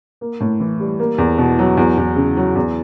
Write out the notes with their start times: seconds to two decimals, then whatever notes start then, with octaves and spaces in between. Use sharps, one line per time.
0.21 A#3
0.40 A2
0.60 E3
0.80 G3
0.99 A#3
1.18 E2
1.38 B2
1.59 F#3
1.77 E2
1.98 E2
2.16 C#3
2.37 F#3
2.55 E2